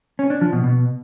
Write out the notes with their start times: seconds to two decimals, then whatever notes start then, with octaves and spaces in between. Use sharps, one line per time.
0.19 C#4
0.30 D4
0.41 F3
0.53 B2
0.64 B2